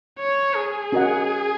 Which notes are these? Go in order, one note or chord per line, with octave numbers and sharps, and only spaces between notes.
C#5
G#4
C#4 F#4 A#4 D#5 F#5